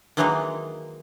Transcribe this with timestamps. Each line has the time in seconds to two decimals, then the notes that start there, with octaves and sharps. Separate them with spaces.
0.17 D#3 E3 F#3 G#3 A#3 D#4